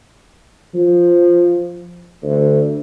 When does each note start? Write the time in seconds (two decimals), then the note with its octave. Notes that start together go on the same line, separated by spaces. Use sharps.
0.74 F3
2.23 D2